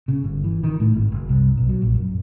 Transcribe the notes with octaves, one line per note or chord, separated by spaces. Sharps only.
C#3
G1
E3
D#3
A2
G#1
F#1
C2
B1
F#3
A#1
F#2